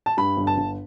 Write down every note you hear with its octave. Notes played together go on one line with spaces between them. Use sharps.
A5
G2 B5
G1
A5
G1